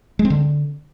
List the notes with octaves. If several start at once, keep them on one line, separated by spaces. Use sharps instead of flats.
G#3
C4
D3